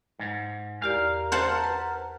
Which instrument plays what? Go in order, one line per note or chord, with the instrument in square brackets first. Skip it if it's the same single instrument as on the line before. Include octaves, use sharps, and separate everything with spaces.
[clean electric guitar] G#2
[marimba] E2 G4 D5 [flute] A#4 [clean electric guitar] F5
[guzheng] C5 F#5 A5
[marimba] B4 A#5